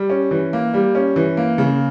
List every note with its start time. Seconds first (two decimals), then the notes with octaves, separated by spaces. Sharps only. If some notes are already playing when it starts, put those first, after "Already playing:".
Already playing: G3
0.10 C#4
0.31 E3
0.53 A#3
0.74 G3
0.95 C#4
1.16 E3
1.37 A#3
1.58 C#3